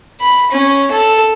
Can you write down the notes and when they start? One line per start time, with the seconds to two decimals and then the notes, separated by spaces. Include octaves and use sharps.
0.21 B5
0.52 C#4
0.91 A4